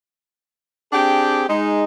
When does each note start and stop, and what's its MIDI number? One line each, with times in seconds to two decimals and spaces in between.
0.93 1.45 60
0.93 1.45 62
0.93 1.45 67
0.93 1.45 68
0.93 1.45 79
1.49 1.84 56
1.49 1.84 63